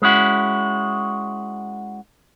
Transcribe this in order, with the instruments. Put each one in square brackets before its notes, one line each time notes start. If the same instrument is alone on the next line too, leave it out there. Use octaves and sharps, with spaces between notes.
[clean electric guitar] G#3 C#4 E4 F#4